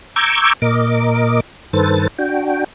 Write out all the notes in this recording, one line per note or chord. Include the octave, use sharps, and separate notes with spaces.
A#5 C#6 D6 E6 G6 G#6
A#2 A#4 D#5 D6
G2 D#3 A4 B4 C5 A6
D4 F#4 G5